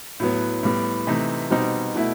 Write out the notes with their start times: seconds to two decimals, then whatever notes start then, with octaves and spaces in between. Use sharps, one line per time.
0.20 A2 F#3 B3
0.63 A2 G3 B3
1.07 C3 E3 A3 D#4
1.50 B2 G3 C4 D#4
1.95 B2 A3 E4